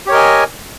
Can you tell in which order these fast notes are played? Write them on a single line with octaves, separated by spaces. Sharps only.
G4 C#5 A#4 D#5 G#5